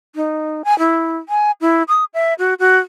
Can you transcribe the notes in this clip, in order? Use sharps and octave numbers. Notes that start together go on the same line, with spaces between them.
D#4
G#5
E4
G#5
E4
D#6
E5
F#4
F#4